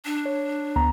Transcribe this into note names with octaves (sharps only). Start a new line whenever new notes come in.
D4
C#5
D2 B3 A#5